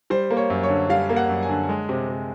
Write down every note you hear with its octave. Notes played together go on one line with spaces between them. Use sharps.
G3 C5
A#3
C#5
F#2
C#5
D3
G3 F5
A#3
F#5
F#2
G#5
D3
G#3
C3
C3